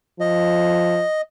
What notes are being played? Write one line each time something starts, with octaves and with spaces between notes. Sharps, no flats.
F3 D#5